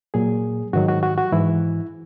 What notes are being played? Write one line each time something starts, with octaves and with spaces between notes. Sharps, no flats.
A#2 F#3 G#4
G#2 D#3 F#3 F#4
F#4
F#4
F#4
G#2 E3 E4